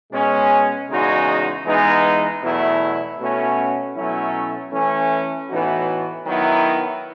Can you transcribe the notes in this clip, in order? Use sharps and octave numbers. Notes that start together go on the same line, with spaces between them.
B2 G#3 C#4
E2 C#3 G#3 D#4 F#4
E3 G#3 B3 D#4
E2 B2 F#3 A3 E4
B2 A3 C#4 F#4
B2 F#3 A3 C#4 E4
E3 A3 C#4
A2 E3 B3 D#4 F#4
D#3 F#3 B3 E4